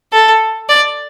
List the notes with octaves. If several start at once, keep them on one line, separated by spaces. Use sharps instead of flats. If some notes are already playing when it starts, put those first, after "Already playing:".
A4
D5